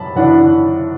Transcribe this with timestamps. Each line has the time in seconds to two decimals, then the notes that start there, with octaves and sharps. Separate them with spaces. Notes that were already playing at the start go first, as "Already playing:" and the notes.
Already playing: F#2 A5 B5
0.16 F#2 E3 D4 F#5